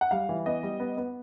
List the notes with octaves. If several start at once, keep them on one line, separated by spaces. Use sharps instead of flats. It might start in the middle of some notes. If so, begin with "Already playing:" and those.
F#5
G3 F5
E3
B3 D#5
G3
B3
B3